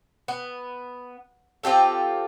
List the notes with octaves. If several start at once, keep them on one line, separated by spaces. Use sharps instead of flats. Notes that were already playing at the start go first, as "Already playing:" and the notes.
B3
C4 F4 G4 A4